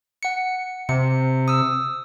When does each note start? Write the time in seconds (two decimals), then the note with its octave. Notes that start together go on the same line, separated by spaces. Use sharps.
0.23 F#5 C#7
0.89 C3 C#7
1.48 D#6 E6